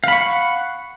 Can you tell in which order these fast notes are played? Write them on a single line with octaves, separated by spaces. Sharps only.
F5 B5 C#6 F#5